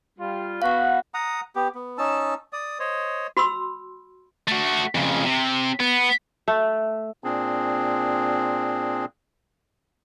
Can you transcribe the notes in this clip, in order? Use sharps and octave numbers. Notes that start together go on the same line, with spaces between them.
G3 F4
B3 F#4 F5 F#5
F#5 A#5 D#6
B3 G4
B3
C#4 D#4 A5 E6
D5 D#6
C5 C#5 D#5
F#4 B5 C6 E6
A3 F#4
F2 C#3
C3
B3
A3
A#2 C4 D4 G#4